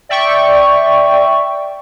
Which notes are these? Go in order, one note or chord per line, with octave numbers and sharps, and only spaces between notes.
D5 E5 G5 C#6